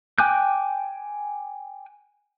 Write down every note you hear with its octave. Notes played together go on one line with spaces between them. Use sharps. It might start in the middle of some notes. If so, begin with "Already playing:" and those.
G5 G#5 D6 F#6 G6